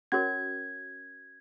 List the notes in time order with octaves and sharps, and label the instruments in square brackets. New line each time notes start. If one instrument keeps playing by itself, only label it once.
[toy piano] C#4 F#4 A#4 C#5 [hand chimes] G#6